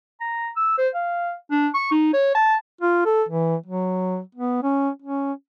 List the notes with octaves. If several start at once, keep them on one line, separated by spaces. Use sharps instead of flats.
A#5
E6
C5
F5
D4
C#6
D#4
C#5
A5
F4
A4
E3
F#3
B3
C#4
C#4